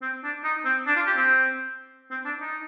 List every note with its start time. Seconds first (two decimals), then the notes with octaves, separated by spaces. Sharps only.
0.02 C4
0.24 D4
0.44 D#4
0.65 C4
0.87 D4
0.96 F4
1.06 G4
1.17 C4
2.11 C4
2.25 D4
2.40 D#4